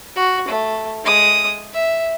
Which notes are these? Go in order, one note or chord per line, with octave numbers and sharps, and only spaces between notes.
F#4
A3
G#3 D#6
E5